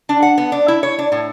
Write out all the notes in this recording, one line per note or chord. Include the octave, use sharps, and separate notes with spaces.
D4
F#5
B3
D4
E4
C#5
D4
A2